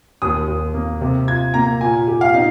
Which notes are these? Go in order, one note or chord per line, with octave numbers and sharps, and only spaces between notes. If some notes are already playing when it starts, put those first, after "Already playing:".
D#2 D#6
D#2
A#3
C3
F4 G#6
A#3 A#5
A#2 G#5
G4
F5
D#4